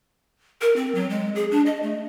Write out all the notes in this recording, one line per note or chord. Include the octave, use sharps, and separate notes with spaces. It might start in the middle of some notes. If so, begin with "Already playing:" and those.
A#4
C4
F#3
G#3
G#4
D4
D#5
A3